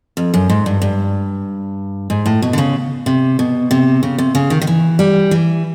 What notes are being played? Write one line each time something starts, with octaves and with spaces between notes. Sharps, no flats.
F2
F#2
G#2
G2
G2
G#2
A2
B2
D3
C#3
C3
B2
C3
C#3
C3
C#3
D#3
D#3
E3
G3
E3